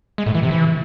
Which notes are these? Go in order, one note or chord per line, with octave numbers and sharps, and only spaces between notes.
G#3
A2
E3
C3
E3